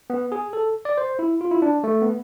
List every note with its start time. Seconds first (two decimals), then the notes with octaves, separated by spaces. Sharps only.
0.10 B3
0.32 G#4
0.53 A4
0.85 D5
0.97 C5
1.19 E4
1.41 F4
1.51 E4
1.62 D4
1.84 A3
2.02 B3